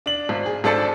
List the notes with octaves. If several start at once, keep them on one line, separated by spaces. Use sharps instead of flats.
D4 F#7
G#1
G#4
G#1 D4 A4 C5 A5 C#7